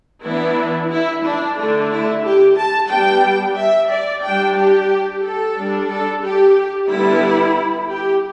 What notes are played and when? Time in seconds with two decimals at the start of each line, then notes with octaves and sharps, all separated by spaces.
0.24 E3 B3 D4 E4
0.90 E4
1.24 D4
1.57 D3 A3 D4
1.90 E4
2.23 G4
2.57 A5
2.90 G3 B3 D4 G5
3.57 E5
3.90 D5
4.23 G3 D4 G5
4.57 G4
5.23 A4
5.56 G3 D4
5.89 A4
6.22 G4
6.89 D3 G3 B3 E4
7.89 G4